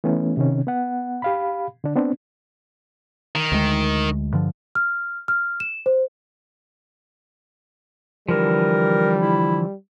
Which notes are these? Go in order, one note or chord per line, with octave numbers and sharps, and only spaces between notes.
E3 A3 B3 C#4
C3 D#3 C#4
B3 F#5
G4 F5 B5
D3 D4
B3 C4 D4
D#3
D2 G#3
G2 D3 F3
F6
F6
E7
C5
D3 E3 F3 G3 A#4
E4